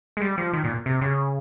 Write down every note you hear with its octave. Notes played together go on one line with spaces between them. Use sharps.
G#3
G3
F3
D#3
A#2
C3
C#3